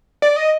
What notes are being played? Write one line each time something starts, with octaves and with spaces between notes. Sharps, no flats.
D5
D#5